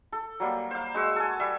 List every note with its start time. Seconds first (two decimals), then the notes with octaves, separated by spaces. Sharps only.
0.12 A4
0.40 F#3 G3 A#3
0.71 C5 F5
0.94 G#3 F#4 C#6 E6
1.16 A4 G#5
1.40 G3 E5